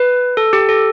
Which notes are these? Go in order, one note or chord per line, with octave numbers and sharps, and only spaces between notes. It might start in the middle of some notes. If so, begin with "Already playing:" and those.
Already playing: B4
A4
G4
A4